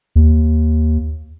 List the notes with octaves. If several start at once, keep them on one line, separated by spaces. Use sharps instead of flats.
D#2